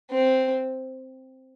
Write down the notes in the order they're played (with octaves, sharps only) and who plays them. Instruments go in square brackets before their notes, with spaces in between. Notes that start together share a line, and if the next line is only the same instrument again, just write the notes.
[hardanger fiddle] C4